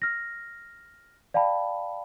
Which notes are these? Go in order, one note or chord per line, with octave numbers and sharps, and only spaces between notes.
F6 A#6
D5 F5 G5 A5 B5